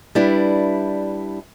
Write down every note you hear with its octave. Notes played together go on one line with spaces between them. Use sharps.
G3 D4 E4 B4